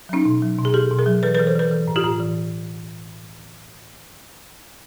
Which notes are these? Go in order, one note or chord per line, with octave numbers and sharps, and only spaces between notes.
F#3 C#4 D#4
B2
F#3
B2
G#4
B2 G4 A4
B2
G#4 A#4
F#3
E3 A4 B4
A4 B4
E3
A#4 C5
E3 A4 B4
E3
A2
F4 G4
A2
E3